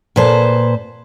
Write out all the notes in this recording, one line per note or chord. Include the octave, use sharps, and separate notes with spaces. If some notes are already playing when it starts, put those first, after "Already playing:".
A#2 B4 C5 A5